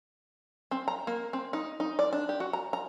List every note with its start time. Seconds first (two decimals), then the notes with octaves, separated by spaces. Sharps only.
0.71 C4
0.88 A#5
1.07 A#3
1.33 C4
1.53 D#4
1.80 D#4
1.99 D5
2.13 D4
2.29 G4
2.40 F#4
2.53 A#5
2.73 A#5